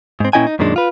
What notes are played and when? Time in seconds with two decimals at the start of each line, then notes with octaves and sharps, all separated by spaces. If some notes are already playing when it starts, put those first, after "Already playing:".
0.20 G#2 C4
0.33 A#2 C#4 E4 D#5 G5 G#5
0.47 D#4
0.59 F#2 A#2 D#3 G#3 C#4 D4
0.76 F4 B4